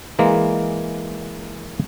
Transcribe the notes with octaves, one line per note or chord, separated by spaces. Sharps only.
E3 G#3 A#3